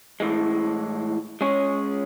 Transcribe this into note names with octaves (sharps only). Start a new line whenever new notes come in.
A2 E3 G#3
G#3 C#4 G#4 C#5